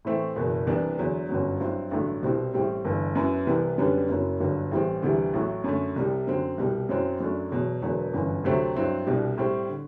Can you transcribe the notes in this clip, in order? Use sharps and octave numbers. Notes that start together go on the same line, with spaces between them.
A2 E3 A3 C4 E4
F#1 E2 B2
C2 C3 E3 B3 D4
E2 D3 F#3
G1 F#2 F#3
G2 F#3 C4 E4
A1 G2 D3 F#3 A3
C2 B2 G3 C4 E4
A1 A2 G3 C4
G1 G2 E3
F#2 F#3 B3 E4
C2 C3 E3 B3
F#2 D3 G3 B3 D4
F#1 F#2 F#3
G1 G2 D3 F#3
A1 A2 E3 G3 C4
D2 C3 E3 G3
A1 A2 F#3 A3
F#2 D3 A3
C2 C3 G3
F#2 D3 F#3 C4
C2 B2 G3
F#2 F#3 C4 E4
F#2 F#3 A3 D4
E2 B2 F#3
E1 E2 D3 F#3 B3
G1 F#2 E3
D2 C3 F#3 A3 C4
G2 F#3 C4 E4
C2 B2 G3 D4
A2 G3 C4
D3